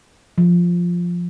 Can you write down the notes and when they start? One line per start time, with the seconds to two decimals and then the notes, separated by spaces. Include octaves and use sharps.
0.38 F3